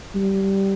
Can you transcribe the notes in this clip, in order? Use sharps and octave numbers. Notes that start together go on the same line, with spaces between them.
G3